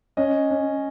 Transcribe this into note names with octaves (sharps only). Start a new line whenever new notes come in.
C#4 D#5
C#4